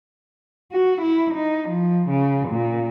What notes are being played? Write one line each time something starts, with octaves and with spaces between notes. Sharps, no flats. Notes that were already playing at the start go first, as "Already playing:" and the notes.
F#4
E4
D#4
F3
C#3
A#2